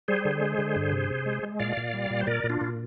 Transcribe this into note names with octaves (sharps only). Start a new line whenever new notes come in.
G3 G#4 C5
D3
G#3
D3
G2
C3
C3
G#3
G#3
A#2 D5 F5
A#2
G3
A#2
C5
A#2 A#4 D5
A#2
D4 F4
A#2